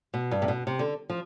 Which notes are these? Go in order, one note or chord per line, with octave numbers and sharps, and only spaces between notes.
B2
G2
C3
B2
C3
D3
F3